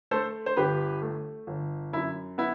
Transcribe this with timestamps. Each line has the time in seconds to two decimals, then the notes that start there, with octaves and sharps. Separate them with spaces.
0.11 A3 A4 C5
0.46 C5
0.57 G1 G4 B4
1.02 A3
1.47 G1
1.93 F#2 E4
2.38 B3 E4